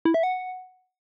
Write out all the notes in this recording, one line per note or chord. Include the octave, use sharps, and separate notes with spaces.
E4
E5
F#5